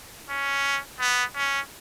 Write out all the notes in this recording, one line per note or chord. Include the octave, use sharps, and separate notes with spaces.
C#4
B3
C#4